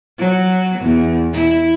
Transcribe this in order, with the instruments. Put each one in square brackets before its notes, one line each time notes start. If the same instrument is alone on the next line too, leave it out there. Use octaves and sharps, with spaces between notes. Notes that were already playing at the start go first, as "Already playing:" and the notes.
[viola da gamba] F#3
E2
E4